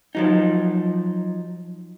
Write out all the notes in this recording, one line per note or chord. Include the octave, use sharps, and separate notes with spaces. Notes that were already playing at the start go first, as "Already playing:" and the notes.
F3 F#3 D#4